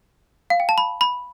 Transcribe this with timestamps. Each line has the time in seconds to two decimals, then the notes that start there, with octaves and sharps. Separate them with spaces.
0.50 F5
0.60 G5
0.69 A5
0.78 B5
1.01 B5